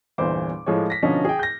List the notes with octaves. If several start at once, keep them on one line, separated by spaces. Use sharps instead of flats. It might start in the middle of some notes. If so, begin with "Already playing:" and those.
G1 E2 A#2 C5 D6
A2 F3 G#3 C#5
A#6 B6
B2 D3 F3 C#4 D#4
G#4 G5
G6 A#6